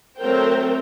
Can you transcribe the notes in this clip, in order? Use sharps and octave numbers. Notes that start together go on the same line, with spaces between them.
F#3 A3 C4 A#4 C5 G5